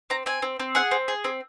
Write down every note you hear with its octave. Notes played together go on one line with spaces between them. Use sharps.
C4 A#5
C4 G#5
C4
C4
G#4 F#5
C4
G#4
C4